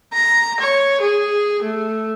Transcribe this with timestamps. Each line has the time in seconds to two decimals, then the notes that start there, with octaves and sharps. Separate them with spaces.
0.13 A#5
0.60 C#5
1.01 G#4
1.63 A3